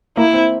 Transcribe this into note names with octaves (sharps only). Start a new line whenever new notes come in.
A#3 E4
C4